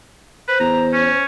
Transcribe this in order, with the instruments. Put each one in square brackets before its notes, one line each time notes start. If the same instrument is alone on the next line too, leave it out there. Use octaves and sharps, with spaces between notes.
[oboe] B4 [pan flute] C5
[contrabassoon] E2 [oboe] A#5
[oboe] C#4